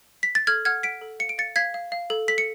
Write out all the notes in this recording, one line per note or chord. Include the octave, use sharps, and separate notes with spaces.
B6
A6
A4 F6 G#6
F#5 F6 G#6
F#5 B6 D7
A4
F5 C#7
D7
F5 A6 C#7
F5 G#6 B6
F5
F5
A4
A4 B6
C#7